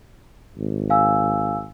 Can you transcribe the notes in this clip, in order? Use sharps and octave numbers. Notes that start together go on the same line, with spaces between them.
G#1
F5 G#5 E6